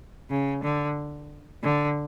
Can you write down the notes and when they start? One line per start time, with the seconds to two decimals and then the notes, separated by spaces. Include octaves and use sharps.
0.30 C#3
0.63 D3
1.63 D3